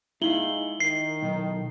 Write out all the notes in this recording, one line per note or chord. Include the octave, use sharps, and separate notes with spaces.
G#3 D#4 E4 F5 F#7 G7
D#3 C7
B1